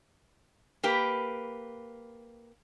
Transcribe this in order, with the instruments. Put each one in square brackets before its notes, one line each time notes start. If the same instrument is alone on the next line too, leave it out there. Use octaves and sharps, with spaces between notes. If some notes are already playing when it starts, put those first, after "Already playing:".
[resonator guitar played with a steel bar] A#3 G4 B4